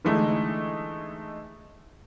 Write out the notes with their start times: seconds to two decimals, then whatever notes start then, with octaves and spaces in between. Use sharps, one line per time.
0.05 D3 E3 G#3 A3 D#4